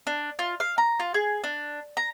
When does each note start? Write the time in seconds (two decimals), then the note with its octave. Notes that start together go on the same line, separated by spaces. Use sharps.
0.07 D4
0.39 F4
0.60 F5
0.78 A#5
1.00 F4
1.14 G#4
1.44 D4
1.97 A#5